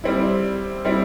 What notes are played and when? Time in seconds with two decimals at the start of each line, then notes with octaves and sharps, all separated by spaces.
0.04 G3 C4 E4
0.85 G3 C4 E4